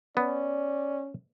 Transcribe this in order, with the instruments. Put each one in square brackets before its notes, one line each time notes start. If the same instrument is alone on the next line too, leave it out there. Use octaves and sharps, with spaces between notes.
[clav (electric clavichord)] B3 [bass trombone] C#4 [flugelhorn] D5